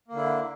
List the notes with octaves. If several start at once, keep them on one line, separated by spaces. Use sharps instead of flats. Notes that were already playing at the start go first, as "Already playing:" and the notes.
D3 A#3 E4